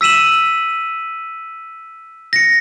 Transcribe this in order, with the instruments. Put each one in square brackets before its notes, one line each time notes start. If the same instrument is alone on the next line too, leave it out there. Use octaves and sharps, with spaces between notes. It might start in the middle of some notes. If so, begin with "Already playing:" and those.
[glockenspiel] E6 B6 D#7 E7 F#7
A#6 C#7